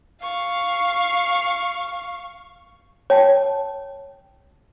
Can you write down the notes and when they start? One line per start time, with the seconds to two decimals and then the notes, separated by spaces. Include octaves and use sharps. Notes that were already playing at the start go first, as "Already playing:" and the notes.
0.22 F5 C#6
3.10 C#5 G5 A5